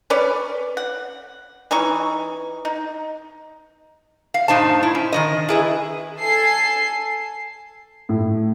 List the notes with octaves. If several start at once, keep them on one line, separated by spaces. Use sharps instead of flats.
C#4 B4 C#5 D5
F#5
E3 C#4 D#4 C#6
D#4
F5
G2 A#2 D#4 C5 A5
E4
C#4
D#3 E3 D#5
E4 G#4 B4
A4 G#5 C7
A2